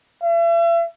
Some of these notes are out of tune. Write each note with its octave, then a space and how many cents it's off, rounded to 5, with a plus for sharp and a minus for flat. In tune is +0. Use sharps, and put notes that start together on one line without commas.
E5 +40